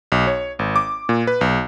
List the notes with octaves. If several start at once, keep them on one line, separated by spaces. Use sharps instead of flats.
B1
C#5
G#1
D6
A#2
B4
B1